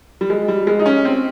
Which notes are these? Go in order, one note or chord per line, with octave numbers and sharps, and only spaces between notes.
G3
G#3
G3
G#3
D#4
C#4
C4